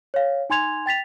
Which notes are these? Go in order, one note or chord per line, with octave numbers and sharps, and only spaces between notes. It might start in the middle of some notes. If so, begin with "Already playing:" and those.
C#5 F5
D#4 G#5 C6 G#6 F7
G5 A6 B6 F7